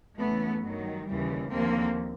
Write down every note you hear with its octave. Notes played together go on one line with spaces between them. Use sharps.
E2 C#3 E3 A3 B3
G2 D#3 F#3
D#2 C#3 E3 G3
D#2 D3 F3 A#3 C4